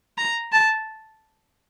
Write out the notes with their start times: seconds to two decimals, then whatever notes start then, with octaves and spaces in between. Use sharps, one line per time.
0.18 A#5
0.52 A5